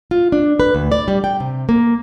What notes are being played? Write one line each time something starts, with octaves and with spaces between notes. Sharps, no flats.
F4
D4
B4
D2
D5
G3
G5
C3
A#3